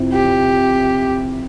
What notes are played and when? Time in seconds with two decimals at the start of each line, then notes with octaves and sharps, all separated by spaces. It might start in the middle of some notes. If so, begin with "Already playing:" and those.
Already playing: F2 C3 F3 C4 E4
0.13 G4